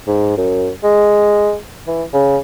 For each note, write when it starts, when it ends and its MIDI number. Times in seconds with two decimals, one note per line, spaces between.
0.07 0.34 44
0.37 0.70 42
0.83 1.56 56
1.87 2.03 52
2.14 2.38 49